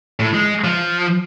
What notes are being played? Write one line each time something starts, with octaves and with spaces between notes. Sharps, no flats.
A2
G#3
F3